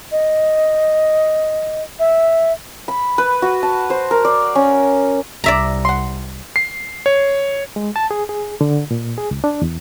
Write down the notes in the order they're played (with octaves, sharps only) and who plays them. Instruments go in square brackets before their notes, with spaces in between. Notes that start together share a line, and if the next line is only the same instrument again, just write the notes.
[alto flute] D#5
E5
[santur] B5
B4
F#4
A5
C5
A#4
D5
C#4
[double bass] C2 [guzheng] D5 E5 A#5
[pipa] F#5 C6
[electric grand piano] C7
C#5
[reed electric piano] G#3
A5
G#4
G#4
D3
A#2
G#4
C#2
D4
E2